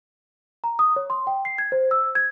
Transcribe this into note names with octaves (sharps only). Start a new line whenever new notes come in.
A#5
D#6
C#5
C6
G5
C7
G#6
C5
E6
G#6